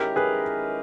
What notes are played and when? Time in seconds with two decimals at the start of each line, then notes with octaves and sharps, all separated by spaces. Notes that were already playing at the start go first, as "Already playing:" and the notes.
Already playing: D#3 G#3 C#4 E4 G4 A#4
0.16 G#4 B4